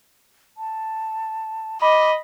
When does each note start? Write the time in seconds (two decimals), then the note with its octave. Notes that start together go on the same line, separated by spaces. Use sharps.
0.57 A5
1.82 D#5 B5 D6